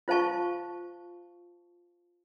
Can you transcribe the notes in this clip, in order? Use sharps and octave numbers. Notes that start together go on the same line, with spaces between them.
F4 C5 F5 A5 C#6